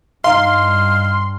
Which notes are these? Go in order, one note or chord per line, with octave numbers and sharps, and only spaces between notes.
G2 D#4 F5 C6 F6